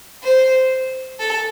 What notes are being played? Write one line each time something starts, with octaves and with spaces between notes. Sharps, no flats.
C5
A4